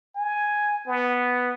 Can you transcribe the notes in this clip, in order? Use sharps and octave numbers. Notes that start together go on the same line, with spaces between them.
G#5
B3